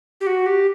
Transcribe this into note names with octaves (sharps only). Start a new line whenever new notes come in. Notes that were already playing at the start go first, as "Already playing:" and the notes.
G4
F#4
G4